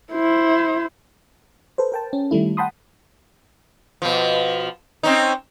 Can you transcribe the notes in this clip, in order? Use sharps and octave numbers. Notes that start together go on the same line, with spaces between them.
E4 C5
A4 B4 C5
A#4 G5 A5
C#4
D#3 G3 A3 E4
F#5 G5 A5 B5 C6 D#6
B2 F3
C4 C#4 D#4